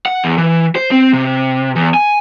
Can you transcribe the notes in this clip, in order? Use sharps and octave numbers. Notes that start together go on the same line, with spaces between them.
F#5
E2
E3
C5
C4
C3
E2
G#5